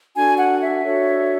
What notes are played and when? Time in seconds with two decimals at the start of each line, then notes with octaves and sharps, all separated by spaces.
0.15 D4 F#4 A4 G#5
0.39 F#5
0.61 E5
0.84 D4 F#4 A4 C#5